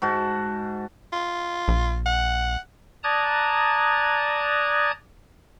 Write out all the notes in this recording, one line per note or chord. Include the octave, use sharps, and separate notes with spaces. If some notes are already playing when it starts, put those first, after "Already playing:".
G#2 F#4 A5
F4
A#1
F#5
D5 A5 A#5 D#6 F#6 G#6